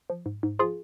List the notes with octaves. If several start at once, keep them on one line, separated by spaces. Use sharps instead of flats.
F3
G#2
G#2
F3 F4 G#4